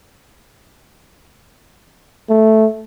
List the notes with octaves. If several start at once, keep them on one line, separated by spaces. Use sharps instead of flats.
A3